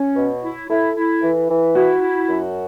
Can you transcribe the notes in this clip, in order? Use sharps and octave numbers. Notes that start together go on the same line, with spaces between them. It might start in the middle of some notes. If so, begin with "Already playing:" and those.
Already playing: C#4 C#5
B2
E4
E4 A4
E4
E3
E3
E4 F#4
E4
F#2